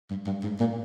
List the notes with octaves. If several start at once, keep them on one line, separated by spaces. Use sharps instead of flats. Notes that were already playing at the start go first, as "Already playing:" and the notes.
G2
G2
G#2
A#2